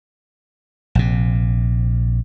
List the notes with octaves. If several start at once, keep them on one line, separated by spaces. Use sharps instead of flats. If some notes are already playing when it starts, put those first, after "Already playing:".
A#1 C3